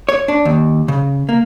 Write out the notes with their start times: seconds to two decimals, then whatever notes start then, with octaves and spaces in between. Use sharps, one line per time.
0.09 C#5
0.28 D4
0.45 D#2
0.88 C#3
1.29 A#3